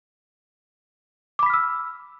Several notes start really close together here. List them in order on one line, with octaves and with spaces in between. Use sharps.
D6 B5 B6 F6 E6